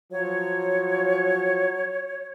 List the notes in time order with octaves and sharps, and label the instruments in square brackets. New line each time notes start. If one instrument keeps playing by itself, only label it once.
[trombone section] F3 F#3 [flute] C#5